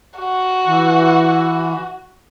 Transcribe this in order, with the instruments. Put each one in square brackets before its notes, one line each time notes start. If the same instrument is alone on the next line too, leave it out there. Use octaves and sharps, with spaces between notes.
[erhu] F#4
[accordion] E3